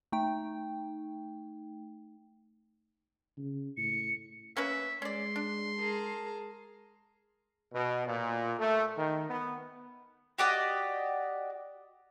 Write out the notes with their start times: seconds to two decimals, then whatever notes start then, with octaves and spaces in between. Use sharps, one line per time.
0.12 A3 D#4 G5
3.37 C#3
3.77 A2 C#7
4.57 A#3 C#4 B4 E5
5.02 G#3 C#4 D5 C6
5.36 D4
5.78 G#4 A#4 A5
7.74 B2
8.07 A#2
8.60 A3
8.98 D#3
9.30 B3
10.38 F#4 G4 D5 D#5